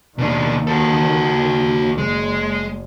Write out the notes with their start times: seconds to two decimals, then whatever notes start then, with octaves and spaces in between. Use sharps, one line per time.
0.18 D#2 B2 D#3 D4
0.67 F#4 A4
1.98 F#1 G#3